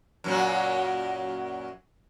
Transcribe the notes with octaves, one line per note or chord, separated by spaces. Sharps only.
F#2 A#2 F#3